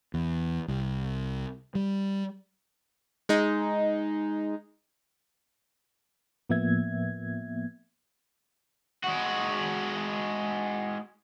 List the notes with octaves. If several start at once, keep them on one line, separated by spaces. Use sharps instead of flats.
E2
C2
G3
G#3 D#4
A2 F3 A#3 B3 E5 G#6
G#3 F#4